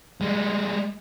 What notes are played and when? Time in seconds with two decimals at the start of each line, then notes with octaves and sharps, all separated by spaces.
0.21 G3 G#3